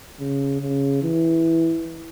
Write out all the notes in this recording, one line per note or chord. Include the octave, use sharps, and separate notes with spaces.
C#3
C#3
E3